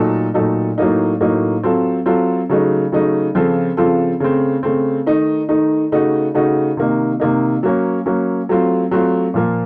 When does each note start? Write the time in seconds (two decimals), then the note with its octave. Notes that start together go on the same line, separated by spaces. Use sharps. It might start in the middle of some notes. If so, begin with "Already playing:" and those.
Already playing: A#2 F#3 A3 D#4 A4
0.34 A#2 F#3 A3 D#4 A4
0.78 A2 F#3 A#3 D#4
1.21 A2 F#3 A#3 D#4
1.63 F#3 C4 F4 A4
2.06 F#3 C4 F4 A4
2.50 C#3 F#3 A3 D#4
2.92 C#3 F#3 A3 D#4
3.35 C#3 F3 C4 F4 A4
3.77 C#3 F3 C4 F4 A4
4.20 C#3 A3 C4
4.63 C#3 A3 C4
5.06 D#3 A3 D#4
5.49 D#3 A3 D#4
5.92 C#3 A3 D#4 F#4
6.34 C#3 A3 D#4 F#4
6.77 C3 D#3 A#3 D#4
7.20 C3 D#3 A#3 D#4
7.63 F#3 A#3 C#4
8.06 F#3 A#3 C#4
8.49 F#3 A3 C4 F4
8.91 F#3 A3 C4 F4
9.34 A#2 F3 A#3